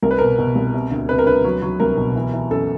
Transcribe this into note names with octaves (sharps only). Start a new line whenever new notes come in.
C2 A#4
B4
B2 A#4
B2
C2
C3
D2
C3 B4
A#4
D2 B4
F#3
F#3
C2 A#4
B2
E3
E3
F#2 A4